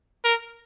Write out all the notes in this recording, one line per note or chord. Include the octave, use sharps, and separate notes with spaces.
A#4